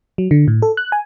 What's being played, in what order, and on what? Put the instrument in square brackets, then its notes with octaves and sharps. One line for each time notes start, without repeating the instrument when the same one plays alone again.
[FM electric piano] F#3
D3
A2
A4
F#6
G#5